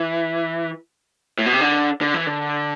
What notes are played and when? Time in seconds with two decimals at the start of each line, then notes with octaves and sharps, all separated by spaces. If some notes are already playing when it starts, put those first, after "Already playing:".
Already playing: E3
1.39 A2
1.46 B2
1.52 C3
1.61 D3
2.01 D3
2.14 E3
2.27 D3